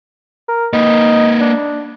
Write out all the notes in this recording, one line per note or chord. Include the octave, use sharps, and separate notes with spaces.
A#4
A#3 D#4 B4
D4